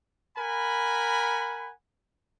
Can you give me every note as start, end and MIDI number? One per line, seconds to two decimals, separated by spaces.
0.38 1.71 70
0.38 1.71 78
0.38 1.71 80
0.38 1.71 83